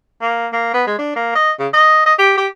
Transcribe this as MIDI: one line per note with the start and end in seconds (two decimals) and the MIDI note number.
0.22 0.47 58
0.53 0.70 58
0.74 0.85 59
0.87 0.96 56
0.99 1.12 62
1.16 1.35 58
1.35 1.51 75
1.59 1.68 49
1.73 2.05 75
2.06 2.14 75
2.19 2.33 67
2.37 2.47 67